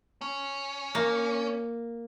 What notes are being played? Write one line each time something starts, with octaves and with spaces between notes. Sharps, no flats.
C#4
A#3